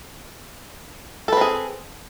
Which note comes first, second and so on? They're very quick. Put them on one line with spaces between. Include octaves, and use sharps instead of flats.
A4 B4 C4 G#4